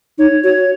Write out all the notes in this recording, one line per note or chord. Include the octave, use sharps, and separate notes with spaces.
D#4 C#5
F#4 C#5